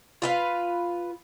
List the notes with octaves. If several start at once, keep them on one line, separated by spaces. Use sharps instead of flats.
F4 B4 F5